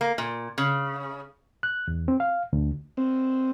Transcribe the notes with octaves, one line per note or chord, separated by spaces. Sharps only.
A#3
A#2
C#3
F#6
E2
C4
F5
D2
C4